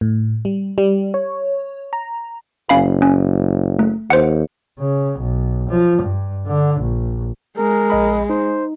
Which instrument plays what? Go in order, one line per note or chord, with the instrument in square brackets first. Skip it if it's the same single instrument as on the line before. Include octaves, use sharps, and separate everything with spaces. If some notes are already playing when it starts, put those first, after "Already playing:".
[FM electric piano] A2
G3
G3
C#5
A#5
[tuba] F#1 [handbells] C#4 F5 B5
[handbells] C#4
A3
[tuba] D#2 [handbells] C5 F#5
[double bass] C#3
B1
F3
G2
D3
A#1
[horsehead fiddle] G#3 [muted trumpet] A#4
[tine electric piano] A#1 D#5 B5
[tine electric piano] D#4 [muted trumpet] C5